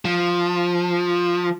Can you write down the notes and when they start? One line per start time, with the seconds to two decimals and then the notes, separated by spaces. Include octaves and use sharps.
0.05 F3